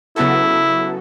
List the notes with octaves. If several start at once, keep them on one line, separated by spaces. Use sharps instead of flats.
C#3 F#3 B3 E4 F#4 A4